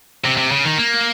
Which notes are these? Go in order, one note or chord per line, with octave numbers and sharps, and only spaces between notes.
C3
C3
C#3
D#3
A#3